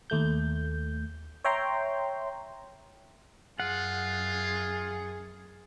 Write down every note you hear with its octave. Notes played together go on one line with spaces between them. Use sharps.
D#2 A3 G6
C#5 E5 G5 A#5 C6
F#2 F4 G#4 F#5